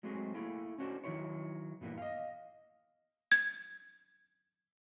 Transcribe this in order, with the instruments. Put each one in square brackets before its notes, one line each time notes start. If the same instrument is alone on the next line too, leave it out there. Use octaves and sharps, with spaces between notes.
[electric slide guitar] F#3 G#3 A3 C4 F#4 G#4
A3 A#3 E4 G#4
C#4 D4 F#4 C5
D#3 F#3 G3 E4 C5 C#5
G2 A#2 E3 A#3 B3
D#5 F5
[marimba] G#6